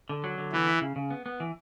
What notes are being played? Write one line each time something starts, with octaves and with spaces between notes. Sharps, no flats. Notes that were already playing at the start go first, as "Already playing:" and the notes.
D3
F#3
D3
E3 B3
E4
C#3
C#3
B3
B3
E3